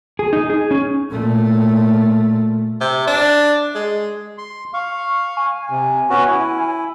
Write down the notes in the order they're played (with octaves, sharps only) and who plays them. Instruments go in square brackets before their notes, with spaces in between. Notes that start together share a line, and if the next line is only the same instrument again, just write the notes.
[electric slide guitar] G#4
D#4
G#4
C#4
[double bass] A#2 A3
[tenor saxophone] C3
D4
G#3
[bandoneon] C6
[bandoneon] F5 [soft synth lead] C#6
[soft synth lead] G#5
[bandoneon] C3
B3 C#4 F#4
E4